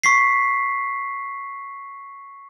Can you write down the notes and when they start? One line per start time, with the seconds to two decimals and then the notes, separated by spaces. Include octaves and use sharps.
0.04 C#6 B6 C7